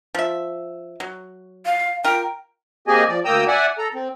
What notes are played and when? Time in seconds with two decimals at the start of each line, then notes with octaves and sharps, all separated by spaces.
0.15 F3 E5
1.00 F#3
1.66 F5
2.04 F4 A#4 G5
2.88 A#3 C4 G4 G#4 D#5 G#5
3.08 F3 D5
3.25 D2 A#3 G5 A#5 D#6 E6
3.48 D5 E5 F#5 G#5
3.79 A4 A#5
3.94 C4